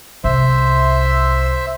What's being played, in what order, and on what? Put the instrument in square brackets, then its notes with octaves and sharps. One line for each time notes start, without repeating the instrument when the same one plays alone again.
[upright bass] C2 [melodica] C5 E5